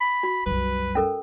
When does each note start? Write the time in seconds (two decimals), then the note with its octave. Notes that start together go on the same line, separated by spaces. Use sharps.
0.01 B5
0.23 F#4
0.46 C2 F#2 B4
0.95 C#4 A4 A#4